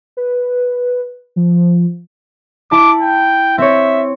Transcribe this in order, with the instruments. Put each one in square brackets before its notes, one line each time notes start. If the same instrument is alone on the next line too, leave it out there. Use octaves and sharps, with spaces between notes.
[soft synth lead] B4
F3
[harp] E4 A5 [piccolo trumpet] D6
[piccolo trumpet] G5
[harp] C4 C#5 [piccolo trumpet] E5